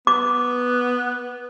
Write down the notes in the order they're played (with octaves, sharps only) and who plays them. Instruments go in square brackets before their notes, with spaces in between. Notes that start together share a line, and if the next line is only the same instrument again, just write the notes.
[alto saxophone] B3 [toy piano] D6